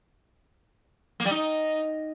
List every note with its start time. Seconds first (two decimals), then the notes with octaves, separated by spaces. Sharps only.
1.20 A#3
1.25 G3
1.31 D#4